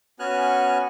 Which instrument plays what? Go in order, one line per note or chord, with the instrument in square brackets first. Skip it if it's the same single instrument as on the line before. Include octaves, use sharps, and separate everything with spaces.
[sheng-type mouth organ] B3 C#4 F#4 G#5 F6 F#6